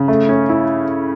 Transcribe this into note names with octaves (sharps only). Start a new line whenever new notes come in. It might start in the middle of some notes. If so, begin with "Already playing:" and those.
Already playing: C#3
A3
C#4
E4